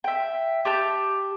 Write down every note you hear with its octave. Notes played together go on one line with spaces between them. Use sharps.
E5 G5
G4 A5 G6